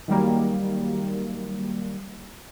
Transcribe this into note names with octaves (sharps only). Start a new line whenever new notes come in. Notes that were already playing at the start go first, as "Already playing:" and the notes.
D#3 F#3 G3 A#3